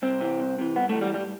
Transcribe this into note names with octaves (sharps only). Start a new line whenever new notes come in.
C2 C4
C3 E3
C2
C3 E3
G2 B3
A3
E3
G3
G2 G3